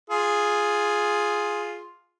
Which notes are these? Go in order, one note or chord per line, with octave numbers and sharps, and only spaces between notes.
F4 G#4